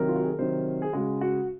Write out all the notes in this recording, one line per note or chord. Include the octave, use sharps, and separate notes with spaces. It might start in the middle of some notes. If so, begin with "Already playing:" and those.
Already playing: C3 D#3 F#3 A#4
F4
F#4
G#4
A#4
C3 D#3 F#3 C5
G#4
C#3 G#3 F#4
F#4